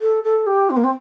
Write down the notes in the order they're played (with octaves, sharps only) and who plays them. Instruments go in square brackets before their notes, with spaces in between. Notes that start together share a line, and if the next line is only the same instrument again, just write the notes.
[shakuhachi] A4
A4
G4
C4
A#3
C4